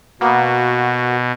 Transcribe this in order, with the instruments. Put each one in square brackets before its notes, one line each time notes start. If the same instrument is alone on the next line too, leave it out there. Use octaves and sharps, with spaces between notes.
[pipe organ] B2 [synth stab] A#3 B3 [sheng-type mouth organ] F#4